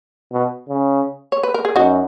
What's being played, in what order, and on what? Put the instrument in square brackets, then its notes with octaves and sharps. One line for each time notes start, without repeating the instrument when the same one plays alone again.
[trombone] B2
C#3
[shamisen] C#5
B4
A#4
G#4
[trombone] F#2 [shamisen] D#4 F#4